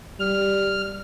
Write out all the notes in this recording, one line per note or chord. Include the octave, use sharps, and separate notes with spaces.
G3 F6